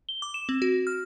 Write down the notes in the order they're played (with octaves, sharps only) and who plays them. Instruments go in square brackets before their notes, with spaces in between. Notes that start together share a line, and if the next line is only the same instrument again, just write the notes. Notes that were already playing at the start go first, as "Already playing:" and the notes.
[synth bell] G7
D6
E7
C4
F#4
F6